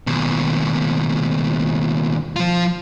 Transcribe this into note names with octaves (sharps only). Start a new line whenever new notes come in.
D#2 B2
F3 F4